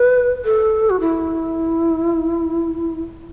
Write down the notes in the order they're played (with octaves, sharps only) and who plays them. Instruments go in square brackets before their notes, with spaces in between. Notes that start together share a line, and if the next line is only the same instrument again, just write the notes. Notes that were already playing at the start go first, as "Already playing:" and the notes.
Already playing: [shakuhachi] B4
A4
F#4
E4